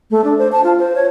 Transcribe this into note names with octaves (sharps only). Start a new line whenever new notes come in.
A3
D4
C5
A5
F4
C5
C#5